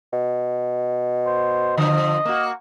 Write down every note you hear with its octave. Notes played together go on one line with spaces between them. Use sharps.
B2
C5
D3 F3 D#5
A#3 F#4